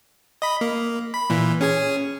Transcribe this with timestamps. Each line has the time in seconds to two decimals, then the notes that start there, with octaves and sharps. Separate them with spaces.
0.42 D#5 B5
0.61 A#3
1.14 B5
1.30 A#2 E3
1.61 C#4 G#4 G#5